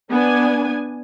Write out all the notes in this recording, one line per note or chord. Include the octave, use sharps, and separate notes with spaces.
B3 D4 G#5